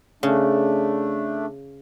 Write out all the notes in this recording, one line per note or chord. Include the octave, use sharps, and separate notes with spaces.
C#3 A3 D4